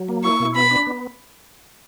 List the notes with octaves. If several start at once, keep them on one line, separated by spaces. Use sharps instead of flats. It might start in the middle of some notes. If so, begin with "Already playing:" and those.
Already playing: F#3
A#3
E4 C#6
B2
B3 B5
D4
B3